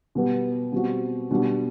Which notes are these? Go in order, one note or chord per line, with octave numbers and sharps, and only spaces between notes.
B2 G3 B3
B2 G3 C4 F#4
B2 G3 D4 F#4